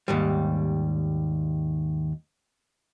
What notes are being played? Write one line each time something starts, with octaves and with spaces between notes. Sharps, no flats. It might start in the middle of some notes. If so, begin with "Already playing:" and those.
D#2 G#2 G3